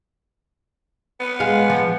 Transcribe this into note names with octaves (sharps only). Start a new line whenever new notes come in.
B3
G#3 F5
F3